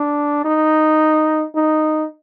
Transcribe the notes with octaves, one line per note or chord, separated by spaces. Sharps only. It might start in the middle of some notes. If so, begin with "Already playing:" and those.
Already playing: D4
D#4
D#4